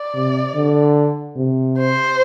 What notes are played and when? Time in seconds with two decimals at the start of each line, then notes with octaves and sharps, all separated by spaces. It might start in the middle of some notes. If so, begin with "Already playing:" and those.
Already playing: D5
0.14 C3
0.55 D3
1.37 C3
1.78 C5